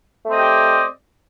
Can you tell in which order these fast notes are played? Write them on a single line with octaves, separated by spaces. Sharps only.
A3 C4 D#5 G4 D5